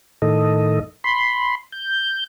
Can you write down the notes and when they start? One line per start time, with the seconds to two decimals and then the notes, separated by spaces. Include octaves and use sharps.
0.22 A2 D#3 A4 D#5
1.04 B5 C6
1.72 G6